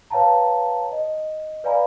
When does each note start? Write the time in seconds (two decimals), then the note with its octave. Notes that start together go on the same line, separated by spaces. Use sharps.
0.11 B4 C#5 F5 G5 A5 A#5
0.92 D#5
1.64 B4 D5 F5 G#5 A#5 B5